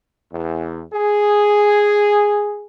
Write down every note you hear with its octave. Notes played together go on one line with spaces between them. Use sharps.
E2
G#4